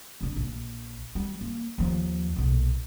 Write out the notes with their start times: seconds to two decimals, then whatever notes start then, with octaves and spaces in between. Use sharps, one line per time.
0.21 C#3 D4
0.36 A#1
1.15 G3
1.41 A#3
1.78 D#2 F3
2.36 B1 A#2